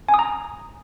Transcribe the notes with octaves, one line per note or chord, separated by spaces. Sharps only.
G#5
D#6
A#5